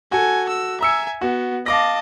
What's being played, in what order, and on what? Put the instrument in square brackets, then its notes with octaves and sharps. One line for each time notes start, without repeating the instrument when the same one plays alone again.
[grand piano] F#4 A4 [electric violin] G#5
[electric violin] E6
[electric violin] E5 G#5 [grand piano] A#5 E6 C#7
[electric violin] B3 [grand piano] F#4
[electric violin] D#5 A5 [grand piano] F5 D6 A#6